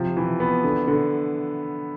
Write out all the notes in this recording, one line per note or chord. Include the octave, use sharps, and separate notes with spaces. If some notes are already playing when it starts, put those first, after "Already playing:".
Already playing: C3 F3
E3
B3
D3
D3